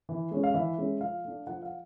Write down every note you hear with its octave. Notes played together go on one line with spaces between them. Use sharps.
E3
G#3 C#4
F5
E3 E5
G#3 C#4
F3 F5
A3 D4
F3 F#5
F5